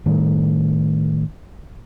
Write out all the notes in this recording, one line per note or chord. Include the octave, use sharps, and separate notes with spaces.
A2 D#3 G3 A3